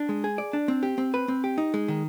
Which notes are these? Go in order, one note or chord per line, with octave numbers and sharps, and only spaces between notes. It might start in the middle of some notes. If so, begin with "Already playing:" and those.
Already playing: D4
G#3
G#4
D5
D4
C4
G4
C4
B4
C4
G4
D#4
G#3
D#3